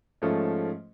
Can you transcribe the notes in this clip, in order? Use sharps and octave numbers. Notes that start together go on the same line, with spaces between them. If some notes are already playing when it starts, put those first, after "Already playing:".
G#2 F3 A3 C#4